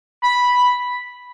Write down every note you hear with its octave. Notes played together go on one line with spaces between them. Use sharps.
B5